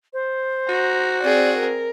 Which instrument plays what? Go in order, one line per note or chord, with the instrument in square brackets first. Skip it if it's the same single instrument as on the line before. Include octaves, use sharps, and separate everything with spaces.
[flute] C5
[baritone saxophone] F#4 [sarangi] A#5
[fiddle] C4 G#4 [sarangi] D5
[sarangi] A#4